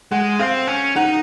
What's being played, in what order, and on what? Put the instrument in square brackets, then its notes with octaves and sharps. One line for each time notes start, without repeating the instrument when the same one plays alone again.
[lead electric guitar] G#3 [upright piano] F#5
[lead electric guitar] C4 [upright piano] F5
[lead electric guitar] C#4
[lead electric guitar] D#4 [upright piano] F#5